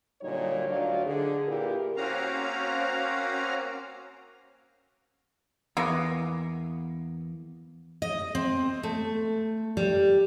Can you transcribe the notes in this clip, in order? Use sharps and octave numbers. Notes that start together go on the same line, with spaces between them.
A#2 D3 F#3 G3 D#4 C#5
D2 F#3 D4 D#4 F4 D5
D3 G#4
A#2 E4 F4 G4 A#4 B4
A#3 C4 C#4 F#4 F5 A#5
E2 A#3 B3
D#5
C4
A3
G3